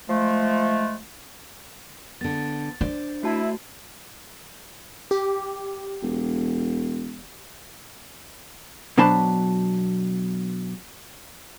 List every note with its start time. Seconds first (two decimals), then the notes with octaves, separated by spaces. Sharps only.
0.09 F3 G#3 A3
2.21 D3 B3 A6
2.81 D4 C5 D5
3.23 A3 E4 F#4 A5
5.11 G4
6.02 E1
8.98 B2 F#3 D4 C5 A5 B5